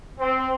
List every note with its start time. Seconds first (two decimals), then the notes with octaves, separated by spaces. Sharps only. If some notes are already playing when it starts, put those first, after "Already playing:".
0.19 C4